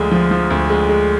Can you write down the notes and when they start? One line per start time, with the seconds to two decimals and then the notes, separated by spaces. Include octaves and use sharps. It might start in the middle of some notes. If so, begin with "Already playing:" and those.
Already playing: D2 D3 F3 G#3
0.11 F3
0.31 F3
0.50 D2
0.70 G#3
0.89 G#3